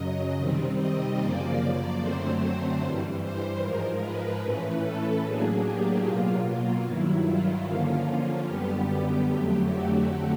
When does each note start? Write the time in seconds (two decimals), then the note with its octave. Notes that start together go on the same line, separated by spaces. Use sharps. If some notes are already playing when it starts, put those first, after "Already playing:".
Already playing: F#2 C#3 F#3 D#5
0.37 C3 D#3 G3 C4
0.78 D#5
1.18 F#2 C#3 F3 A#3 D5
2.00 F#2 D3 F#3 A3 C4 C5
2.81 G2 E3 G3
3.22 C5
3.61 G#2 F3 G#3 A#4
4.02 B4
4.43 A2 E3 A3 C#4
4.83 A4
5.23 A2 F#3 A#3 D4 G#4
5.64 G4
6.04 B2 F#3 A#3 F4
6.85 G2 D#3 F#3 E4
7.26 F4
7.67 D3 F3 A#3 C#4
8.47 F#2 D3 G3 B3 G4
8.88 G4
9.29 F2 D3 F#3 A3
9.69 F#4